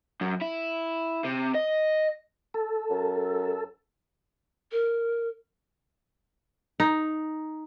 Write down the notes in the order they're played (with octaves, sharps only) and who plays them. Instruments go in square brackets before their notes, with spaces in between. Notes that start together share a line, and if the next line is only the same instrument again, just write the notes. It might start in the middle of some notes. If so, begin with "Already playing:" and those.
[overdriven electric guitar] F#2
E4
C3
D#5
[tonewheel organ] A4
[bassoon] F#2
[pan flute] A#4
[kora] D#4